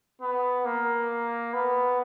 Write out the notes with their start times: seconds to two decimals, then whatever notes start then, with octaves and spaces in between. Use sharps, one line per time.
0.22 B3
0.65 A#3
1.53 B3